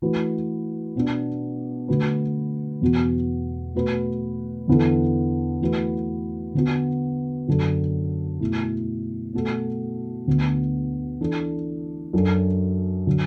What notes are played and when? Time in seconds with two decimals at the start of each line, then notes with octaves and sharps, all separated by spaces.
0.02 E3 A3 F#4 B4
0.95 B2 B3 D4
1.88 D3 A3 F#4 B4
2.81 E2 B2 B3 F#4
3.75 B2 A3 F#4 B4
4.68 E2 D3 B3 E4 A4
5.61 E3 A3 F#4 B4
6.54 D3 B3 F#4
7.48 F#2 D3 F#3 D4 A4
8.40 B2 A3 E4
9.33 B2 A3 F#4 A4
10.27 D2 D3 B3
11.20 E3 D4 A4
12.13 F#2 F#3 D4 A4
13.07 D3 F#3